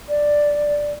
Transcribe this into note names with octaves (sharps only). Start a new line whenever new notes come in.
D5